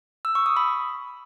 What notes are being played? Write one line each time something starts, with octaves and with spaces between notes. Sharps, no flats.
E6
C#6
D#6
B5